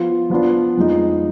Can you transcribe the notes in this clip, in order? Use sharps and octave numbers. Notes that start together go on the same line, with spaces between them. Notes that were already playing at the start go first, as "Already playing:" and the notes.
Already playing: F3 B3 F4
F3 B3 D4 F4
F2 F3 G#3 D#4